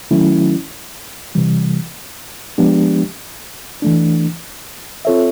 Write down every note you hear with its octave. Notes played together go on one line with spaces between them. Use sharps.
D#3 F#3 A3 C#4 E4
C3 E3 G3
F3 G#3 B3 D4 G4
E3 A3 D4
C4 F4 A4 C#5 E5